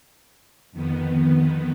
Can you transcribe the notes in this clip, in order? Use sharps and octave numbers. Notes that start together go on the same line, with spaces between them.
F2 D#3 B3